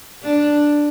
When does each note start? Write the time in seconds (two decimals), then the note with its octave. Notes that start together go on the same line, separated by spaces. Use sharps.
0.23 D4